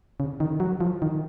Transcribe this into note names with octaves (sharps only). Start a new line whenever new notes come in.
C#3
D#3
F#3
F3
D#3